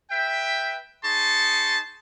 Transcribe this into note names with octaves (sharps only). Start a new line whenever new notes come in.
B4 E5 G5
D#4 G#4 A5 C6 C#6